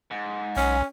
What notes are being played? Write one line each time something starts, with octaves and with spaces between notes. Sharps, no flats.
G#2
B1 C#4 G#5